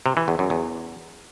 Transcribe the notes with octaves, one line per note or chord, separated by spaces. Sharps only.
C3
E3
E2
F#2
E2